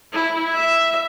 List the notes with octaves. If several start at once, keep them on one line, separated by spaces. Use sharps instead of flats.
E4
E5